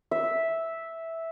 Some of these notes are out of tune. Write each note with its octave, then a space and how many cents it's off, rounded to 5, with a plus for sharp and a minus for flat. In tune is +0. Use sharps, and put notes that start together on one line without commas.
E5 -5